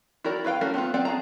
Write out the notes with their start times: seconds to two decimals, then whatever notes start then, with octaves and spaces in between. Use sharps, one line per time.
0.24 E4 F#4 A#4 D5
0.44 E4 B4 F5 G5
0.61 A3 C#4 F#4 A#4
0.74 B3 C4 E4 F4
0.94 B3 C4 D5 F#5
1.05 G#4 A5 A#5